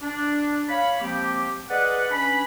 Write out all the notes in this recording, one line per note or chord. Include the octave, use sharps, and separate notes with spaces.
D4
C#5 F5 B5
F3 G#3 A#3 C4 G4
G#4 B4 D5 D#5 F#5
C#4 D4 B4 G#5 B5